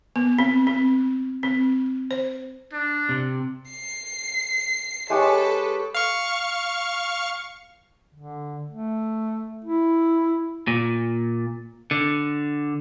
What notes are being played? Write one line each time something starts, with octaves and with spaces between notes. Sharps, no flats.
B3
C4
C4
C4
C5
D4
C3
C7
G#3 G4 A4 B4 C#5
F5 C#6
D3
A3
E4
A#2
D3